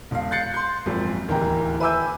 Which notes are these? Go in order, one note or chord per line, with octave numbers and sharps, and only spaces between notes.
E1 F5
F#6 G6 A6 C7 C#7
C6 G6
G#1 F#2 A#2 F3
D1 D#2 E3 A#3 G5 A#5
B4 E5 G#5 D6 E6 G6